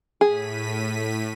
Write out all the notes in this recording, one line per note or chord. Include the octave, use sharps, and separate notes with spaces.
A2 G#4 B6 D#7